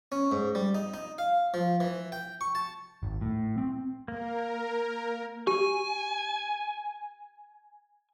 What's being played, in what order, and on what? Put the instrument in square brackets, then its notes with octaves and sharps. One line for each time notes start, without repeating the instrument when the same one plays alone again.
[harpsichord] C#4
G#2
G3
D#4
D#4
F5
F3
E3
G5
C#6
A5
[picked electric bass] G#1
A2
C4
[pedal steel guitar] A#3 [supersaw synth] A#4
[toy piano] G4 [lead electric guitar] G#5